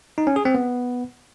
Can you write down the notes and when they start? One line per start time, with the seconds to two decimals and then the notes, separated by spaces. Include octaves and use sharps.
0.18 D#4
0.27 C#4
0.36 G#4
0.45 C4
0.55 B3